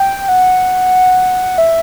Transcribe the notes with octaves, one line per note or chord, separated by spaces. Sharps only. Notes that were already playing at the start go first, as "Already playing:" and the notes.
Already playing: G5
F#5
E5